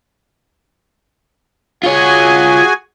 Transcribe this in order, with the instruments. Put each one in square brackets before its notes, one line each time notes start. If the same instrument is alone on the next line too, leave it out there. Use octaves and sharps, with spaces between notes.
[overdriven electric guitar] F4 C#5 [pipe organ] F#4 G#4 G#5